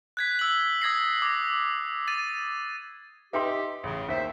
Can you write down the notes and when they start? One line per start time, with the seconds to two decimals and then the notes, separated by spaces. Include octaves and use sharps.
0.17 F#6 G#6 B6
0.39 E6 F#7
0.82 D#6 G#6 A#6 C7
1.22 D6 A#6
2.08 A6 D#7
3.33 D#4 G4 B4 E5 G5 C6
3.83 A1 C#3
4.09 D#2 C5 E5